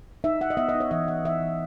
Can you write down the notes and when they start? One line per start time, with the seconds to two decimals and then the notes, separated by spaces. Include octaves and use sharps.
0.24 D#4 E5
0.41 D#4 F#5
0.50 D#5
0.57 B3 E5
0.69 D#5
0.74 D#4
0.80 C#5
0.91 E3 E5
1.08 E3 F#5
1.24 E3 E5
1.42 E3